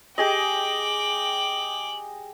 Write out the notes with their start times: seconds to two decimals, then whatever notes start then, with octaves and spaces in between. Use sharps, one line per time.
0.18 G4 G#4 D#5 G5 D6 F#7